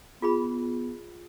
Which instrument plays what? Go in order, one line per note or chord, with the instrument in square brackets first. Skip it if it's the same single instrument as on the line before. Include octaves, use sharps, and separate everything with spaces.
[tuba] B3 [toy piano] F4 G#4 B5